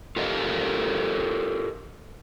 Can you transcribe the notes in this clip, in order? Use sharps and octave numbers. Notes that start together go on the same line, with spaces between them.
F4 G4 A4 A#4 D#5 F5